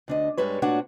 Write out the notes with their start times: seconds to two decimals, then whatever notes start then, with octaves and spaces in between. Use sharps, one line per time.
0.08 D2 D4 D#5
0.38 G2 G3 G#3 B4 C#5
0.62 A#2 A3 D4 F#4 C#5 F#5